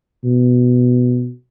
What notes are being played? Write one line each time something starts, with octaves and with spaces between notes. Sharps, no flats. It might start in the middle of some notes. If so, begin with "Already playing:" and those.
B2